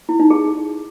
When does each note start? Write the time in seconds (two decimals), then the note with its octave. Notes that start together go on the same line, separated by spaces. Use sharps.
0.09 E4
0.20 D#4
0.30 G#4